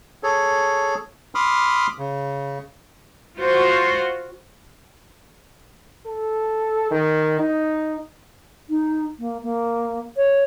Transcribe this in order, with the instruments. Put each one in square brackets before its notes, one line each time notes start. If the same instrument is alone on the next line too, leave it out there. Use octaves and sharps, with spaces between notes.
[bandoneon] G#4 A4 C#5
B5 C6 D6 D#6 F6
C#3
[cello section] F4 F#4 C5
[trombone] A4
D#3
D#4
[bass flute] D#4
A#3
A#3
C#5